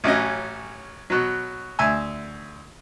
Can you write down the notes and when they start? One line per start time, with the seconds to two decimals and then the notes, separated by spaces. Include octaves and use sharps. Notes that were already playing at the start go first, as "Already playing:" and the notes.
0.04 A1 F#3 C#4 D#5
1.10 B2 F#3
1.79 D2 E5 G#5